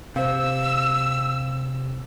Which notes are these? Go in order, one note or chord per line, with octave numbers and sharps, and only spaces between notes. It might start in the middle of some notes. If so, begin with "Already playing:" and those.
C3 C5 F5 E6